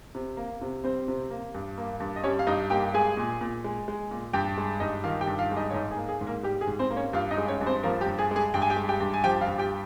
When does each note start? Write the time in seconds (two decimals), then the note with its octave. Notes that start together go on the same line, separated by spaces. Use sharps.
0.15 C3
0.37 A#3
0.61 C3
0.84 G3 C4 C5
1.08 C3
1.30 A#3
1.55 G2
1.78 A#3
2.00 G2
2.16 D#5
2.23 G3 C#4 C#5
2.39 F5
2.47 G2 D#4 D#5
2.70 A#3 G4 G5
2.94 G#3 G#4 G#5
3.17 A#2
3.41 A#2
3.64 G#3
3.88 G#3
4.11 A#2
4.33 G2 G4 G5
4.57 G#3
4.80 G2 D#4 D#5
5.04 D#3 F4 F5
5.21 G4 G5
5.27 G2
5.39 F4 F5
5.51 G#3
5.56 D#4 D#5
5.70 C#5
5.73 G#2 D#4 D#5
5.91 G#4
5.97 A#3
6.09 G#4
6.21 G#2
6.27 A#3 A#4
6.43 G3 G4
6.61 G#4
6.67 G#2
6.79 C4 C5
6.90 A#3
6.96 C#4 C#5
7.13 G2 F4 F5
7.31 D#4 D#5
7.38 G#3
7.48 C#4 C#5
7.61 G2
7.66 C4 C5
7.83 F3 A#3 A#4
8.01 G4
8.07 G2
8.18 G#4
8.31 G#3 G#4
8.54 G2 G5
8.62 G#5
8.70 G4 G5
8.77 G#3
8.89 G4 G5
9.01 G2
9.14 G#5
9.24 F3 G4 G5
9.41 F4 F5
9.47 G2
9.58 G4 G5